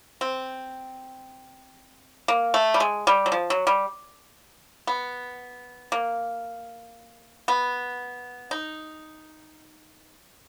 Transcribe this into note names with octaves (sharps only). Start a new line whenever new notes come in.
C4
A#3
A3
G3
G#3
G3
F#3
F3
F#3
G3
B3
A#3
B3
D#4